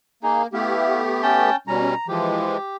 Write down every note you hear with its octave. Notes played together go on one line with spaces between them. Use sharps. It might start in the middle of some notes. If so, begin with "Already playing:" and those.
A#3 D#4 G#4
A3 B3 E4 G4 F5
C#4 G5 A5
B2 G3 C#4 A#5
E3 F3 G#3 G4